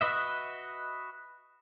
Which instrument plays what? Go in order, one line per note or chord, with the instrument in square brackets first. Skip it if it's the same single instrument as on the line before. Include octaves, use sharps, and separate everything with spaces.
[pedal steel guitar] F#4 B4 D#5 E5